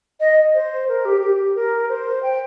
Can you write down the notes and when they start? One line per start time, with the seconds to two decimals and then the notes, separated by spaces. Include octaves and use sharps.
0.20 D#5
0.54 C5
0.89 A#4
1.05 G4
1.21 G4
1.55 A#4
1.89 C5
2.23 G5